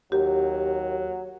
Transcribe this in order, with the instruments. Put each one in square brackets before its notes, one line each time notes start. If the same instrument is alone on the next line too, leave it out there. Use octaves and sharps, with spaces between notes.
[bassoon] D#2 [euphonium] F#3 [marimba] G4